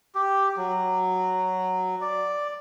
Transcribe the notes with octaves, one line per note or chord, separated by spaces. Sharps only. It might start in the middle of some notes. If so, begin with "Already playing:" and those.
G4
F#3
D5